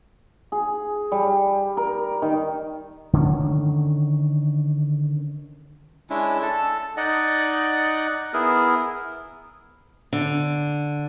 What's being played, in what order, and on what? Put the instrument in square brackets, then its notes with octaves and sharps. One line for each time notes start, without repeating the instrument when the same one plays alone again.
[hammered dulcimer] G#4
G3
A#4
D#3
[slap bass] D3 D#3 G#3 C#4
[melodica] G#3 C#4 D4 E4
A4 A5
D#4 D5 D#5 F#5
B3 E4 G#4 A#4
[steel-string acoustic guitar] D3